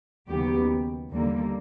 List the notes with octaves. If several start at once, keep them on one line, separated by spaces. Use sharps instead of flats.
D#2 C#3 F#3 B3 G4
D#2 D3 G3 A#3